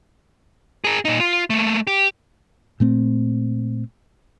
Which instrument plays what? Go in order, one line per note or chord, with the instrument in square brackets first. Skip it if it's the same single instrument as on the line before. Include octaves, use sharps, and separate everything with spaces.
[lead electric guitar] G#4 A#4
A#2 D#4
F4
A3 A#3
G4
[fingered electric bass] A#2 A3 C4